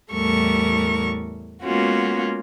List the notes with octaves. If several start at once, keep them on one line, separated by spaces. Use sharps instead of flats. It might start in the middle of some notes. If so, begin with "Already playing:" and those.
E2 A2 G3 A3 A#4 C#6
G#3 A#3 B3 C#4 F4 F#4